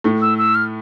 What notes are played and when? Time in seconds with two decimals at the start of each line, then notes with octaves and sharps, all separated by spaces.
0.04 A2 A3
0.22 E6
0.38 E6
0.55 F6